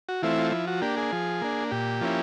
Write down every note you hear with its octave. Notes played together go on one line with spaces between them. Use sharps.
F#4
E3 A3 C4 E4 F4
F4
F3 E4
F#4
A#3 D4 G4
G#4
F3
A#3 D4
A#2 G4
F3 A#3 C#4 E4